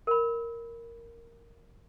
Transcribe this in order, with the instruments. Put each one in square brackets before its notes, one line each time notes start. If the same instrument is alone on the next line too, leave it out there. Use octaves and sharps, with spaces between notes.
[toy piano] A#4 B5